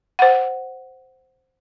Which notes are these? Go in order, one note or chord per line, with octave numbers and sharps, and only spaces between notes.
C5 F#5